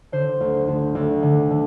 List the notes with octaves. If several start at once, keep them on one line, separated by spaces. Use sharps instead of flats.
D3 C5
D2
D2
D2
D3
D3